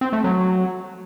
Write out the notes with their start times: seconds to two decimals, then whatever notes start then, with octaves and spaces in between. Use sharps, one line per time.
0.01 C4
0.13 A3
0.24 F#3